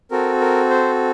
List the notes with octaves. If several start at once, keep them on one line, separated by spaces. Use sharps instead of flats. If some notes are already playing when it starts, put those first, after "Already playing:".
C4 F#4 A4 A#4
A#4
C5